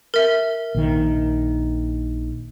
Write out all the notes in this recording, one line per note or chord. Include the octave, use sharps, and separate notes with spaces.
A#4 E5
A#1 D#3